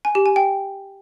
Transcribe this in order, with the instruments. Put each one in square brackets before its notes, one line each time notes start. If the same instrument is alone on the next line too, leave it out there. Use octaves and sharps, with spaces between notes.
[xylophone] G#5
G4
G#5
G5